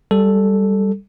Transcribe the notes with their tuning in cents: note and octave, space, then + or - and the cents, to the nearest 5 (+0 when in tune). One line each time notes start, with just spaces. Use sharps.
G3 +0 A4 +0